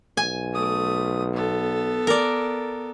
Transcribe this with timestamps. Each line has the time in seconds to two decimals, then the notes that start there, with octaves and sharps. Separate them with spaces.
0.17 B1 G#5
0.53 A3 D#6
1.33 B3 A4
2.07 A#4 D5